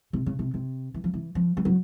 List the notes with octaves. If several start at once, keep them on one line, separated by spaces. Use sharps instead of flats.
C3
C#3
C3
C3
E3
F3
E3
F3
G3
F#3